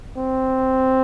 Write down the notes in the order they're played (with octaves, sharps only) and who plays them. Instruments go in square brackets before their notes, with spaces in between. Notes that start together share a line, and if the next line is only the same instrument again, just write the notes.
[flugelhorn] C4